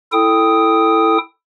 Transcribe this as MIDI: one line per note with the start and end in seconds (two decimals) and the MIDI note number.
0.12 1.18 64
0.12 1.18 69
0.12 1.18 79
0.12 1.18 87